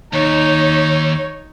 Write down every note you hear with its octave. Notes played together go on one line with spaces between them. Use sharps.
D#2 D#4 C#5